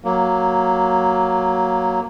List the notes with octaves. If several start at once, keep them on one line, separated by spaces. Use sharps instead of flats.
F#3 A#3